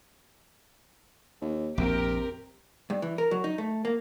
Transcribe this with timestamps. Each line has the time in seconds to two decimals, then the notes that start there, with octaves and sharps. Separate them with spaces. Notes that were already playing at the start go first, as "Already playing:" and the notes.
1.41 D#2
1.78 A#1 F2 C3 G4 A#4
2.90 G2
3.02 E3
3.18 A#4
3.31 F#3
3.44 D#4
3.58 A3
3.85 A#3